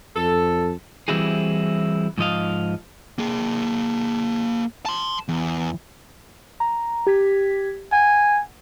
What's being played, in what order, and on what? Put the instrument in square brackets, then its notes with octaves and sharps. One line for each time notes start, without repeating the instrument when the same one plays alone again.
[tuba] F2 [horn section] A4
[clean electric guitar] E3 G3 C4 E4 F#4 G#4
G#2 F3 D#5 F5
[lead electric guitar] A#3 G#4
A5 C6
E2
[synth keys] A#5
G4 G#6 B6
[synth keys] F#5 [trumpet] G#5